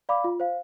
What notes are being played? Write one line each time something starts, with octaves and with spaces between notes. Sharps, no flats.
D5 F5 B5 D6
F4
C5 F5